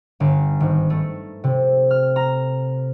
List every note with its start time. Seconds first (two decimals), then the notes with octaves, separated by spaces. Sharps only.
0.20 G1
0.60 G#1
0.90 A3
1.44 C3
1.91 F6
2.16 A#5